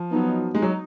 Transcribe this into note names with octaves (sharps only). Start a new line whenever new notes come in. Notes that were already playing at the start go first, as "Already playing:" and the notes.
Already playing: F3
F#3 B3 D#4
G#3 D#4
F#3